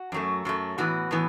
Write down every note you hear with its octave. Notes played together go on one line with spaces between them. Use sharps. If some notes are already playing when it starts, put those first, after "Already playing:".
Already playing: F#4
F#2 F#3 A3
F#2 F#3 A3
A2 E3 B3 F#4
A2 E3 B3